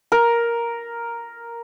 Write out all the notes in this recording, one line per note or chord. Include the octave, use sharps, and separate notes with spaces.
A#4